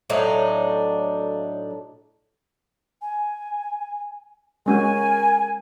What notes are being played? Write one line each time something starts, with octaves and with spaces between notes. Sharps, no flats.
A2 F#3 D4 D#4
G#5
G#3 C#4 F#4 A#4 G#5